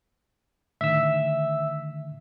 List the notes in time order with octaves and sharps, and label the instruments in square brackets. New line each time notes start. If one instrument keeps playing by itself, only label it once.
[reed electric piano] A2 D3 D#3 [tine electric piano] E5 E6